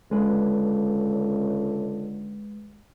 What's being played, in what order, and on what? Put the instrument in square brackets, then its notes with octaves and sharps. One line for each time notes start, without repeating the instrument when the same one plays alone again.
[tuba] C#2 [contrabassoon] D3 [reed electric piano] G#3 B4